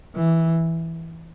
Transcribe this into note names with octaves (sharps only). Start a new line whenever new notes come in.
E3